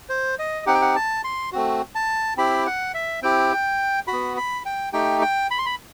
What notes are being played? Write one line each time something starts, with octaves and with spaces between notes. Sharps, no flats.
C5
D#5
C4 D#4 G4 F#5
G5
F#5
A5
C6
A3 C4 F#4
A5
C4 E4 G4 B5
F#5
E5
C4 E4 G4 G5
F#4 B5
B3
B5
G5
A3 D#4 G4 G5
G5
B5
C6
B5